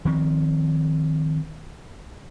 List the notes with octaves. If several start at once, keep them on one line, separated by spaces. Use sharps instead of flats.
D#3 F3 C4